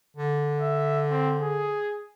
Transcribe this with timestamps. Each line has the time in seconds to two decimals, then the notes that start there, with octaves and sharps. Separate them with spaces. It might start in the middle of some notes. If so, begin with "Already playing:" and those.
0.17 D3
0.61 E5
1.10 C4
1.40 G#4